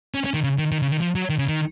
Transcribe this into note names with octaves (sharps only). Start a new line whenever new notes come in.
C#4
C#4
D#3
C#3
D#3
D#3
C#3
D#3
F3
F#3
D#3
C#3
D#3